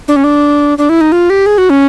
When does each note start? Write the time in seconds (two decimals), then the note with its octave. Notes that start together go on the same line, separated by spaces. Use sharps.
0.08 D4
0.16 C#4
0.24 D4
0.78 D4
0.89 E4
1.01 D#4
1.12 F4
1.30 G4
1.46 G#4
1.58 F#4
1.70 C#4